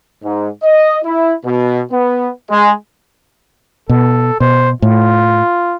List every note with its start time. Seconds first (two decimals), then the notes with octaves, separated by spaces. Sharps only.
0.23 G#2
0.63 D#5
1.04 E4
1.45 B2
1.92 B3
2.50 G#3
3.89 B2 A4
4.40 B2 C5
4.82 A2 F4